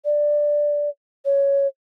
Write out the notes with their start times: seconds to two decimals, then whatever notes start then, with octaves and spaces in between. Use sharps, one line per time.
0.05 D5
1.25 C#5